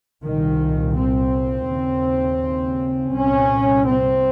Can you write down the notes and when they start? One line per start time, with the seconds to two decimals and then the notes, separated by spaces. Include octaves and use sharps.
0.23 C2 A#2 D#3
0.96 C4
1.68 D#2 C#3
3.13 C2 A#2 C#4
3.86 C4